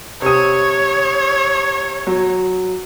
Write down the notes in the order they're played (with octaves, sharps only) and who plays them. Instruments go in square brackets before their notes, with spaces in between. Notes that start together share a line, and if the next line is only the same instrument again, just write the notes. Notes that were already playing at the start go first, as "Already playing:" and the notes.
[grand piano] C3 D#6 [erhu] C#5
[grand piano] F#3